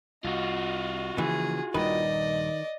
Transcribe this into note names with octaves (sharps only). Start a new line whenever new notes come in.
C2 F4 F#4 D#5
C#3 E3 F3 A#3 G#4
D#1 G2 D#3 G3 B4 D5 D#5